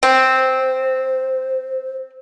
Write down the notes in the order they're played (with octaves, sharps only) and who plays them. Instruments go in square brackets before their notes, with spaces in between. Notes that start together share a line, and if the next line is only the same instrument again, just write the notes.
[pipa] C4 [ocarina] C5